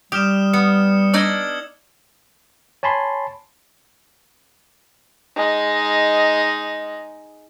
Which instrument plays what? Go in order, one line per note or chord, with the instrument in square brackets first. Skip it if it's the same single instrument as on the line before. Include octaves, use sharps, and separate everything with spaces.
[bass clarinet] G3 [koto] G4 [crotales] D#6 F6 E7
[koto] B3 [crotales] C#7
[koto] D4 D#4 D5 [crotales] E6 G#6 G7
[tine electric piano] C#5 G#5 A5 B5 C6
[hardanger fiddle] G#3 D#4